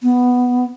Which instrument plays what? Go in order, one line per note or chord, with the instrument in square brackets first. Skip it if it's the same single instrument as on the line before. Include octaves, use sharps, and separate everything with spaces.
[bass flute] B3